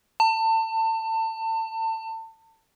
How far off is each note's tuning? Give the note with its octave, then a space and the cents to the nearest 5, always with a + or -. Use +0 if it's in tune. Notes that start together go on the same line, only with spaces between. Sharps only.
A5 +30